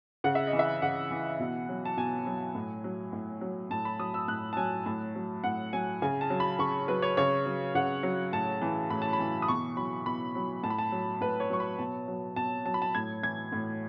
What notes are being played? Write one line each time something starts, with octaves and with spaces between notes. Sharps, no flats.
C#3 F#5
E5
D#5
E3
E5
C#3 F#5
E3
B2
F#3
A5
B2 G#5
F#3
A2
F#3
A2
F#3
A2 A5
B5
F#3 D#6
E6
A2 F#6
A5
F#3 G#5
A2 A5
F#3
A2 F#5
F#3 G#5
C#3 G#5
A5
F#3
B5
C#3 C#6
F#3 B4
C#5
C#3 C#5
F#3
C#3 F#5
F#3
A2 A5
E3
A2 B5
A5
B5
E3
D#6
B2 C#6
F#3 B5
B2 B5
F#3
A2 A5
B5
A5
F#3
A2 B4
C#5
F#3 C#6
B5
B2 A5
F#3
B2 A5
F#3 A5
B5
A5
A2 G#6
E3 G#6
A2